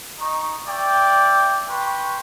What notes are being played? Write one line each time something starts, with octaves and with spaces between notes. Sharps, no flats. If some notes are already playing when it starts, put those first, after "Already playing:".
D#4 C#6
D5 E5 G5
B4 G5 C6 C#6